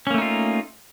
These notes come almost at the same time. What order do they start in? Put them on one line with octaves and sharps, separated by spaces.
C#4 A#3 A3 D#4 F4